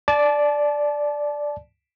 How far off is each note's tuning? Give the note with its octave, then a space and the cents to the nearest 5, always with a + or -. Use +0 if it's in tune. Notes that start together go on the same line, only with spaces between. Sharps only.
D5 +0 A5 -30